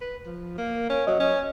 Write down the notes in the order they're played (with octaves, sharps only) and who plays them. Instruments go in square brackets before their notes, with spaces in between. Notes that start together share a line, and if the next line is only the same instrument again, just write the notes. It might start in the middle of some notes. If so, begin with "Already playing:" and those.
[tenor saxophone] B4
F3
A#3
C#4
[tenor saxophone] F#3 [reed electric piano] D#5
[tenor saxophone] C#4